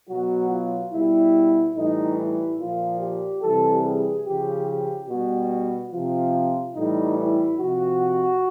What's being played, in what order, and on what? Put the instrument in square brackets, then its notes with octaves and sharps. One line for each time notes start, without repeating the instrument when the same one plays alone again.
[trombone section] B2 F#3 F#4
F4
B2 G3 E4
A2 E3 G3 D#4
E4
A#2 F3 F4
G4
C3 E3 G3 A4
G#4
C#3 F3 G4
G4
B2 G3 F#4
C3 F3 F4
A2 E3 G3 D#4
E4
C3 F3 F#4